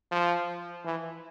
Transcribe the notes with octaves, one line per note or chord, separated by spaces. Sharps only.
F3
E3